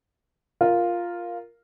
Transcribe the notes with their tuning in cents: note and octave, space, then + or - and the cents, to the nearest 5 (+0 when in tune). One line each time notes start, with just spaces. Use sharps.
F4 +0 A#4 +0